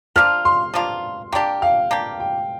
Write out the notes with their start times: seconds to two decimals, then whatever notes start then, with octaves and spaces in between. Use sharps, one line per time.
0.16 F3 A#3 D4 F4 F6
0.45 C6
0.74 F3 A#3 D4 F4
1.32 A#3 D4 G4 G5
1.62 F5
1.91 A#3 D4 G4
2.20 G5